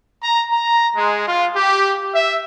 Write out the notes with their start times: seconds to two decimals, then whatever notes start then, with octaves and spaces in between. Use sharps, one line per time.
0.24 A#5
0.52 A#5
0.96 G#3
1.28 F4
1.56 G4
2.15 E5